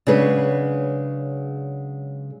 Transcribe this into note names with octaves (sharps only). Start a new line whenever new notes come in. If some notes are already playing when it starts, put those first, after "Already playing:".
C#3 F#3 G#3 D4 G#4 B4